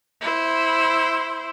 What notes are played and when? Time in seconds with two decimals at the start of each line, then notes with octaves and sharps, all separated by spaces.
0.21 E4 C5